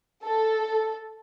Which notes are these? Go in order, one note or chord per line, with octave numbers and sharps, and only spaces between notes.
A4